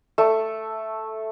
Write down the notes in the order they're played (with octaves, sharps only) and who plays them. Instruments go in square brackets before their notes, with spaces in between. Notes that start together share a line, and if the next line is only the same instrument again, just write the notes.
[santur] A3